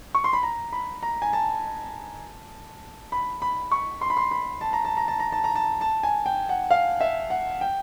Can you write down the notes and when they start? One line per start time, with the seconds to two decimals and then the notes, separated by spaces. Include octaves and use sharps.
0.15 C#6
0.24 C6
0.33 B5
0.43 A#5
0.73 B5
1.03 A#5
1.22 G#5
1.33 A5
3.12 B5
3.42 B5
3.72 C#6
4.01 C6
4.10 B5
4.17 C6
4.31 B5
4.61 A5
4.73 A#5
4.85 A5
4.97 A#5
5.08 A5
5.20 A#5
5.32 A5
5.44 A#5
5.56 A5
5.81 A5
6.03 G#5
6.26 G5
6.49 F#5
6.71 F5
7.01 E5
7.30 F#5
7.61 G5